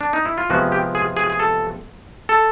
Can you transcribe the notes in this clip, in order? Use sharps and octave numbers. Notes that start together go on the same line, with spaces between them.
D4
D#4
E4
F4
C3 F3 G#3 B3 F#4
G4
G#4
G#4
G#4
A4
A4